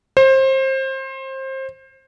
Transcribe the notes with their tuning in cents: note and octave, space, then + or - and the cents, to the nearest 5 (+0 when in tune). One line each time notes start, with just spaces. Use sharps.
C5 +25